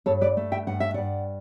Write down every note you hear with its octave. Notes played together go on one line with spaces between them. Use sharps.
G2 A4 C#5
B4 D5
A3
E5 G5
G2 F#5
E5
G2 D5 F#5